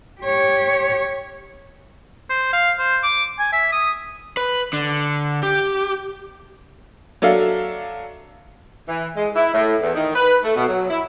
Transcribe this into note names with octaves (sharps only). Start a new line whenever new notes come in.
G4 C#5
C5
F5
C5
D6
G#5
E5
D#6
B4
D3
G4
F#3 D4 A4 E5 F5
E3
G#3
E4
A2
E2
D#3
B4
A3
B2
F#3
E4